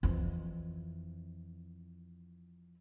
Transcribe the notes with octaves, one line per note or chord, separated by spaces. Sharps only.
F2 E3